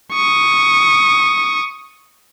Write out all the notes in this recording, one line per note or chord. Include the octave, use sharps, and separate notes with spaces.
C#6 D#6